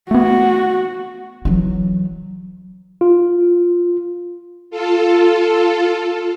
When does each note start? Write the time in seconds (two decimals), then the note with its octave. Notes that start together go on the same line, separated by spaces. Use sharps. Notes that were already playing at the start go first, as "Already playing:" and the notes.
0.11 A3 B3 F#4
1.45 E3 F#3
3.01 F4
4.70 F4 A4